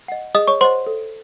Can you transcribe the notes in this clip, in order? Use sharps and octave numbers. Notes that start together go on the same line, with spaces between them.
D#5 F#5
G#4 D#5 D#6
C#5 C#6
C5 D#5 F#5 C6
A4